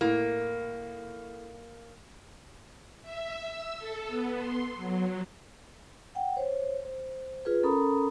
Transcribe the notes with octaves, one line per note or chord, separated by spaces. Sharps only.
A2 A#3
E5
E6
A4
B3
C6
F#3
F#5 G5
C5 C#5
C5
F4 G#4 B4
C#4 A4 A#4 A#5 B5 D#6